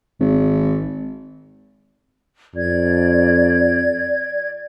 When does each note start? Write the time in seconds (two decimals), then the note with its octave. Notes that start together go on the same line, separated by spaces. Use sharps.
0.20 G#1
2.55 F2 D5 G#6